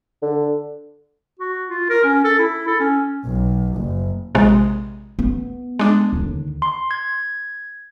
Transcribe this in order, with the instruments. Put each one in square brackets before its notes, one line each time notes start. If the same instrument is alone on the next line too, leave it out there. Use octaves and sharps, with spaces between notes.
[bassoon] D3
[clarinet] F#4
F4
A#4
C#4
A4
E4
A4
C#4
[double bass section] B1
F#1
[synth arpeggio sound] A#1 C3 G#3
[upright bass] B3
[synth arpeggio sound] G#3 D4
[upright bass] D#2 D3
[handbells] C6
G#6